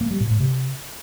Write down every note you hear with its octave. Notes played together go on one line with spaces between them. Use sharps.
A#3
G3
A#2
A2
C3